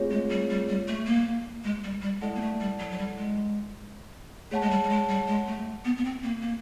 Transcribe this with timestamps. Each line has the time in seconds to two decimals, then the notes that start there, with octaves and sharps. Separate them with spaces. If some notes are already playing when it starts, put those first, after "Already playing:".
Already playing: A3 C4 F4 G#4 C#5
0.10 G#3
0.30 G3
0.50 G3
0.69 G3
0.88 A3
1.06 A#3
1.64 G#3
1.84 G3
2.02 G3
2.21 G#3 E4 A4 D5 F#5 A5
2.35 A#3
2.41 A3
2.60 G3
2.79 F#3
2.91 F#3
2.99 G3
3.18 G#3
4.51 A3 G#4 C#5 F#5 A5
4.62 G#3
4.70 G3
4.84 G3
4.89 G#3
5.09 G3
5.27 G#3
5.47 A3
5.85 B3
5.97 B3
6.05 C4
6.23 A#3
6.41 A#3